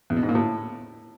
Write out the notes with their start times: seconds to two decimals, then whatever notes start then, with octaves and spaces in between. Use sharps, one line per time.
0.10 E2
0.16 B2
0.23 G#2
0.29 A#2
0.35 A2